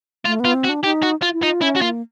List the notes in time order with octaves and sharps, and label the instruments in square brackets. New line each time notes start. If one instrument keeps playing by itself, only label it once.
[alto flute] A3 [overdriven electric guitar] F4
[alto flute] B3 [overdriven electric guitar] F4
[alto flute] C4
[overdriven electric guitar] F#4
[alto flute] D4
[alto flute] D#4 [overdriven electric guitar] G4
[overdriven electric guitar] F#4
F4
[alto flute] E4
[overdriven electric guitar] D#4 [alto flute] F4
[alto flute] C#4 [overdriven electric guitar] E4
[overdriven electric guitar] F#4
[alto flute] A#3 [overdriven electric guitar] F4